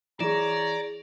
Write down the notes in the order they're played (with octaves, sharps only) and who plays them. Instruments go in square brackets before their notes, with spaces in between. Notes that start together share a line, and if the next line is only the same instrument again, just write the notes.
[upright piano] E3 [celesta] G#4 E7 [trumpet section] C#5 A#5 [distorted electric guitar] D5